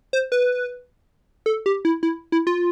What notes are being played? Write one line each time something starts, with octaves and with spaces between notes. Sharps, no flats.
C5
B4
A4
G4
E4
E4
E4
F4